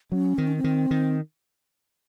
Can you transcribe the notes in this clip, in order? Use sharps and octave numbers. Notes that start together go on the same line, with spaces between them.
F#3 C#4
D#3 C4
C#4
C4
D#3
D#3